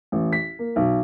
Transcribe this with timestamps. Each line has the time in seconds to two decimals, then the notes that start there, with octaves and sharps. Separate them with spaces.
0.12 A1
0.33 B6
0.59 A#3
0.76 B1